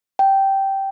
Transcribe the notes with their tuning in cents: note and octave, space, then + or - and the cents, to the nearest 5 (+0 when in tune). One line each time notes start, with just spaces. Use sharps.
G5 -10